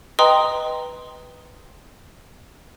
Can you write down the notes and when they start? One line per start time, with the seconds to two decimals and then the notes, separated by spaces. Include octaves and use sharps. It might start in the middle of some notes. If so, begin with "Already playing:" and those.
0.19 B4 D#5 G5 A#5 C6 D#6